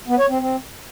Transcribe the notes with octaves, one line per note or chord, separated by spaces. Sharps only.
B3
C#5
C4
C4